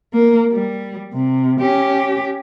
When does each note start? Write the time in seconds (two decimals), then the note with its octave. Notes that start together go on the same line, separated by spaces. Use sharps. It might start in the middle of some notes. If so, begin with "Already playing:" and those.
0.13 A#3
0.53 G3
1.13 C3
1.61 C#4 G4